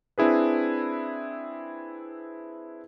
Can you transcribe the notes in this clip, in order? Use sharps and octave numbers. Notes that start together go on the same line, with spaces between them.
C4 D4 E4 G#4 B4